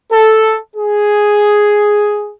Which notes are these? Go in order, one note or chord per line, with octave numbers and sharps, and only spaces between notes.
A4
G#4